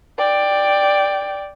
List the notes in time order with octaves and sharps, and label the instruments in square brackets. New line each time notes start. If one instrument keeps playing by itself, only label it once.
[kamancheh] D5 G5